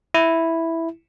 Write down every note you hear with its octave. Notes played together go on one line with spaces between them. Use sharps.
E4